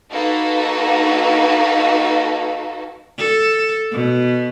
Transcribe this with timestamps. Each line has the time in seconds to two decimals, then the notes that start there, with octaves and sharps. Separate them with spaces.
0.11 A#3 D#4 F#4 A4 B4
3.18 A4
3.92 B2